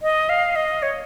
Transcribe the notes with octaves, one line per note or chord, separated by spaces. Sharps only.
D#5
F5
D#5
C#5